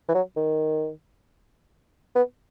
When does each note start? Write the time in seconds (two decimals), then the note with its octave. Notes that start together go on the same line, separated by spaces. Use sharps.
0.09 E3
0.15 F#3
0.36 D#3
2.15 B3